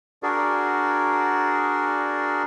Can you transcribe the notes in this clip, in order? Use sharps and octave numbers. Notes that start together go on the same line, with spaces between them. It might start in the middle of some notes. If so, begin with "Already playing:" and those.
D4 F#4 G#4 A#4 D5